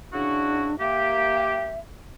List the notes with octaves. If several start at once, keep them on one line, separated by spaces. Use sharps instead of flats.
C#3 D4 E4 F#4
A#3 G4 E5